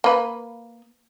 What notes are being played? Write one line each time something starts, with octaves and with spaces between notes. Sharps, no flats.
A#3 B4